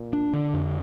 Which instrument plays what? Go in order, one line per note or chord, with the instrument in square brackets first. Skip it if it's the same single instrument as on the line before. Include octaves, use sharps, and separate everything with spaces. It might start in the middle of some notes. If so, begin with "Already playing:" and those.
Already playing: [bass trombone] A#2
[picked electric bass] D4
D3
F2